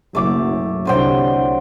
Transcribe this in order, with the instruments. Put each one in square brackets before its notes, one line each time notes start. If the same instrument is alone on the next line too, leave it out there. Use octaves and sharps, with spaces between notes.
[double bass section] F#1 B1 [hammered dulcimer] A3 D6
[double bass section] C2 D3 [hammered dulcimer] F#3 C5 G5